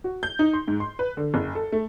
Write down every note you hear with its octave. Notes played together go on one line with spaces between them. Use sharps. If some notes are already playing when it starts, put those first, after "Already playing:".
F#4
G6
D#4
C6
G#2
C6
B4
D3
F#1
A4
A3